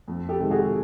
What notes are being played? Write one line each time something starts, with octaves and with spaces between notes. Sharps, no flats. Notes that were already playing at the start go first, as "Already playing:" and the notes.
F2
G4 A4
C3 D#3 G#3
F#4 G#4